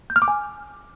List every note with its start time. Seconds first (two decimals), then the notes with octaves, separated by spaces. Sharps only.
0.10 G6
0.16 F6
0.22 D6
0.28 G#5